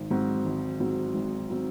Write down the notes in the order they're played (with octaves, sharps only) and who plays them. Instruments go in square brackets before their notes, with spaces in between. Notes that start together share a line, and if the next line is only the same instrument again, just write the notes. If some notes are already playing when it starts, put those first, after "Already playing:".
Already playing: [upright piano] G#1
G#2 F#3 C4 F#4
G#1
G#2 F#3 C4 F#4
G#1
F#3 C4 F#4